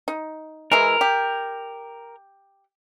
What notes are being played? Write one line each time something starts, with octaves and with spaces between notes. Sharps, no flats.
D#4
E3 G#3 E4 A#4
G4